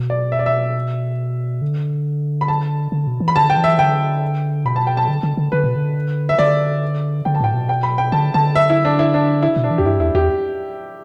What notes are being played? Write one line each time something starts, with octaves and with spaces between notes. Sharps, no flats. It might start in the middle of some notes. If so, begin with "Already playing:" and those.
Already playing: B2
D5
E5
D5
E5
D3
B5
A5
D3
B2
E3
B5
D3 A5
G5
E3
E5
D3 G5
B2 B5
A5
G5
A5
D3
D3
D3
D3 B4
B2
D3
E5
D3 D5
D3 G5
A5
A2 G5
B2
G5
B5
G5
D3 A5
D3 A5
E5
E4
D4
E4
D4
E4
B2
D4
E3
E2 G4
G2 E4
E2 E4
E2 G4